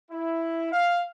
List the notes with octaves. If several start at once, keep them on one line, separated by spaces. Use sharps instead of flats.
E4
F5